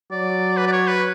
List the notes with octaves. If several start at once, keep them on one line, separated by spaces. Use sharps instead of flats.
F#3 D5
B4
D5
C#5
B4